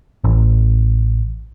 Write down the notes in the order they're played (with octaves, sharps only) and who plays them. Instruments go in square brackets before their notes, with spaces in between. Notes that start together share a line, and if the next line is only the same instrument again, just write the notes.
[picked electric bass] A1